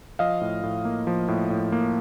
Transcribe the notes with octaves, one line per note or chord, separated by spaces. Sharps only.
F3 D#5 F5
A2
A2
A#3
F3
A2
A2
A#3